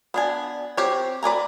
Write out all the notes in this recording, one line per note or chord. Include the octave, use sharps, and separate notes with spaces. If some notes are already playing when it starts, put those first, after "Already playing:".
B3 D4 G#5
C4 G4 C#5
B4 D5 G#5 A#5